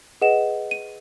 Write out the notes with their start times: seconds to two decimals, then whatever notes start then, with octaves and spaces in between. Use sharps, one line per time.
0.21 G#4 B4 D#5 F#5 E7
0.71 D#7